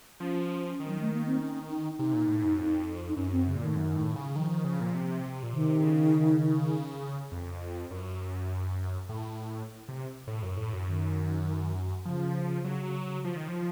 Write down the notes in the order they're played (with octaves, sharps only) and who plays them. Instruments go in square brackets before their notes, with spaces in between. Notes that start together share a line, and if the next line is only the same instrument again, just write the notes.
[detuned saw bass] F3 [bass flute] C#4
[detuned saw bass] D#3
[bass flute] F#3
A3
A#3
C4
C#4
D#4
[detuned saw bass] C3 [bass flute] D#4
[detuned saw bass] A#2
A2
F#2
F2
[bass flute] D#4
[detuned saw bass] F#2 [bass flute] C#4
[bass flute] C4
C#3
[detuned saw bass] A#2
[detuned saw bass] A2 [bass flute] D#3
[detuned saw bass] F#2
A2
C#3
[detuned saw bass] D#3 [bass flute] F3
[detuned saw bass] D#3
C#3
A#2
C3
A#2
[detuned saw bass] C3 [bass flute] D#3
[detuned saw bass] C3
C#3
F2
F#2
A2
C3
A2
F#2
A2
F#2
[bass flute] D#3
[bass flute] C#3 [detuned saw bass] F3
[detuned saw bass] F#3
F3
D#3
F3